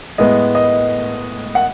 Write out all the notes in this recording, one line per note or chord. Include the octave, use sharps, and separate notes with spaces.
A2 G#3 B3 D#5
D#5
F#5